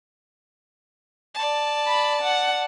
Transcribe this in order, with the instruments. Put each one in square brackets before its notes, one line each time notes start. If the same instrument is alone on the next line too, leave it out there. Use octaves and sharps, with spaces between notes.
[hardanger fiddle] D5 A5
[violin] B5
F#5